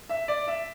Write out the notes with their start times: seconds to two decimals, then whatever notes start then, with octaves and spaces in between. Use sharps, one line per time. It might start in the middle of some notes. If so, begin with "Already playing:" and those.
0.09 E5
0.28 D5
0.48 E5